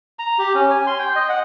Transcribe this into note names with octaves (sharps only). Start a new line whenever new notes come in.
A#5
G4
C#4
G#5
C6
G5
D#5
F#5